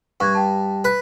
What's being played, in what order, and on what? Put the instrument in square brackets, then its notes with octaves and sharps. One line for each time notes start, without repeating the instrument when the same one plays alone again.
[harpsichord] G2 [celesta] C#6 F#6 G#6
[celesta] G5 A5
[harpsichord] B4